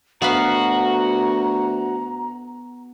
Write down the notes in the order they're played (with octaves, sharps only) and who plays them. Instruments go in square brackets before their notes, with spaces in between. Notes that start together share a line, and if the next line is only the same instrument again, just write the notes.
[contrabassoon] D2 [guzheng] B3 F5 B5 [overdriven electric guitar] F#4 [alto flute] A#5